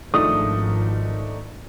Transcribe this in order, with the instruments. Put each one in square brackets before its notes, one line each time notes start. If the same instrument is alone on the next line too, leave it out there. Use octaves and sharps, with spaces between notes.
[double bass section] G#1 F3 [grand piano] A3 D4 D#4 [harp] D#6